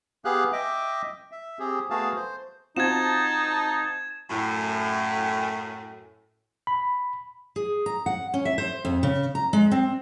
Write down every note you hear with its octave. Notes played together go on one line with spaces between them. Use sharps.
B3 G4 G#4 F5 F#6
D#5 E5 G5 D6
E5
C4 G4 G#4
A3 B3 F#4 G#4 F5 A5
C5
C4 D#4 F4 F#4 A5 G#6 E7
F#2 A2
B5
G#4
A#5
F#5
C#4
E5
C5
F2
C#3
A#5
G#3
C4